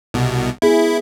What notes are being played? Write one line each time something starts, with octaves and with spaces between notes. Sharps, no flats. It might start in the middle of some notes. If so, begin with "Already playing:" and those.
C2 B2
B3 E4 G#4